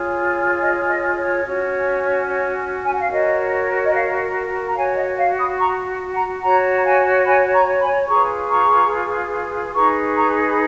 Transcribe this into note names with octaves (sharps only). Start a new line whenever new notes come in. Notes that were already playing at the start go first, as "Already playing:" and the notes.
Already playing: F4 G#4 C#5
D#5
D#5
C#5
C#4 F#4 C#5
C#5
G#5
F#5
F5
F#4 A#4 C#5 D#5
D#5
C#5 F5
A#5
F#4 C#5 F5 G#5
D#5 F#5
C#5 F5
B5 D#6
A#5 C#6
F#5 A#5
F#4 C#5 F#5 A#5
A#5
F5 G#5
G#5 B5
A#5 C#6
G#5 B5
F4 G#4 B4 A#5 C#6
A#5 C#6
D#4 G#4 B4 A#5 C#6
A#5 C#6
B5